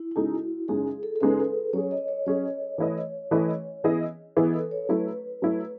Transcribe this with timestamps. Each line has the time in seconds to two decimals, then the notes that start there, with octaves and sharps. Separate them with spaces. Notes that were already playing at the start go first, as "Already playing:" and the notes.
Already playing: E4
0.11 E4
0.16 C#3 G#3 D#4 F#4 A4
0.68 F#2 C#3 G#3 D#4 G#4
1.03 A4
1.16 A4
1.21 F#2 C#3 G#3 D#4 B4
1.73 F#3 C#4 G#4 C#5
1.91 D#5
2.08 C#5
2.26 F#3 C#4 G#4 C#5
2.78 E3 A3 E4 B4 D#5
3.31 E3 A3 E4 B4 D#5
3.84 E3 B3 E4 G#4 D#5
4.37 E3 B3 E4 G#4 B4 D#5
4.54 A4
4.71 C#5
4.89 F#3 A3 E4 B4
5.42 F#3 A3 E4